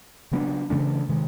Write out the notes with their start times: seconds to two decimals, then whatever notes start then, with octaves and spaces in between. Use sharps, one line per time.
0.31 C#3 F#3 B3 D4
0.70 C#3 E3 A3 D4
1.09 C3 D#3 G#3